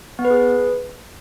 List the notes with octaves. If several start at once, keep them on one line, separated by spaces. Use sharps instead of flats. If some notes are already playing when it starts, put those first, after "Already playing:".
B3
B4
G#4
B4